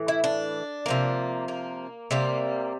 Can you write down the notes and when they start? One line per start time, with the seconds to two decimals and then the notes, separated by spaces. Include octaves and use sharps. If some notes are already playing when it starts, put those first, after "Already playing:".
Already playing: A2 E3
0.08 E4
0.24 D4
0.86 C3 F3 A#3
1.48 A#3
2.11 C3 G3 A#3